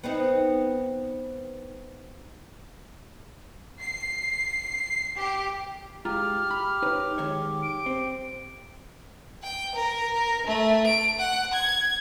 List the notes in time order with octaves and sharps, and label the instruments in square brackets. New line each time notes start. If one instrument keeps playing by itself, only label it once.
[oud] B3 C4 D#4
[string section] C7
G4
[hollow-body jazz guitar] G#2 F4 A#5 [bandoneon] G4 [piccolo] F6
[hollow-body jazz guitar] B5
D#4 B4 C#5
G#2 D#3 C#5
[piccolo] D7
[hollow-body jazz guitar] C4
[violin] G5
A#4
A#4
A3
D7
F#5
G#6